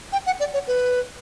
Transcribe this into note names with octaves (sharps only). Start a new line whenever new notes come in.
G5
F#5
D5
C#5
B4